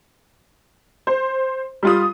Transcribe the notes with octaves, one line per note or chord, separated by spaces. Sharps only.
C5
G3 F4 D#6